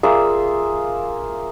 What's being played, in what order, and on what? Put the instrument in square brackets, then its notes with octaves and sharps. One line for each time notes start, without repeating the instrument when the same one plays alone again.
[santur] A#3 F4 G#4 E5